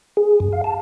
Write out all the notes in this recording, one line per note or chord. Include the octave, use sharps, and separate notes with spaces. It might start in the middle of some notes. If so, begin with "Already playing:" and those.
G#4
F#2
F5
A5